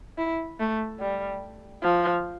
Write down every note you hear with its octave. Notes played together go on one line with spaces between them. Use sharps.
E4
A3
G3
F3